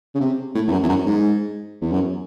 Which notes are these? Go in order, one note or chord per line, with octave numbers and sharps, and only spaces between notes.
C#3
C3
A2
E2
F#2
E2
F#2
G#2
E2
F#2